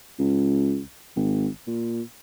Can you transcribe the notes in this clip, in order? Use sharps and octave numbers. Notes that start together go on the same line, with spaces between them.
C#2
G#1
A#2